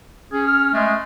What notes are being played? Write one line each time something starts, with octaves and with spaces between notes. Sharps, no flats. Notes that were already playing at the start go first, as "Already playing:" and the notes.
C#4 G#4
F6
G#3 A3